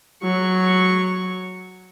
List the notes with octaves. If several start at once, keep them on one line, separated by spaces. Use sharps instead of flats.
F#3 C#6